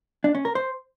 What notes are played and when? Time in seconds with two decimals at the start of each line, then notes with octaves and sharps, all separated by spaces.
0.24 D4
0.35 C#4
0.45 A#4
0.55 C5